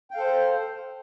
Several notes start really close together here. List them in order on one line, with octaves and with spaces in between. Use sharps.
G5 F5 A4 C5